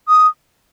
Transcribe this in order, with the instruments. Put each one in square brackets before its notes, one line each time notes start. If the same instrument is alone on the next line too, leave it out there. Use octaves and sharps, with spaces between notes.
[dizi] D#6